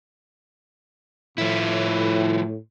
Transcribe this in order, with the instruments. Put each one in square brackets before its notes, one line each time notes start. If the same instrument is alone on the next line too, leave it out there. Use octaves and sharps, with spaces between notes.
[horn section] A2 [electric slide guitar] F3 E4